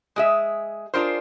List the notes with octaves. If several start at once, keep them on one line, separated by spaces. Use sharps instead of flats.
G#3 G#4 E5
D4 F4 G#4 A#4 C5